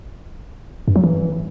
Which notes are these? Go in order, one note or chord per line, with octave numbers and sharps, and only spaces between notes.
G2
F#3
E3